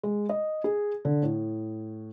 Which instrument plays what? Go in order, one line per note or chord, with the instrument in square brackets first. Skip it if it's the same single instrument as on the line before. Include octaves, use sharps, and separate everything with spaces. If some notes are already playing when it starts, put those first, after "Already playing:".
[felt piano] G#3
D#5
G#4
D3
A2